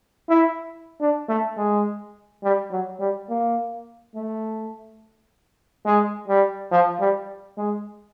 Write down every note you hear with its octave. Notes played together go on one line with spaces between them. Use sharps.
E4
D4
A3
G#3
G3
F#3
G3
A#3
A3
G#3
G3
F3
G3
G#3